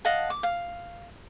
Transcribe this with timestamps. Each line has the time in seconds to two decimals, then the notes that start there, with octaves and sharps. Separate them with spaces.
0.05 D#5 F5 F#5 A5
0.30 D6
0.43 F5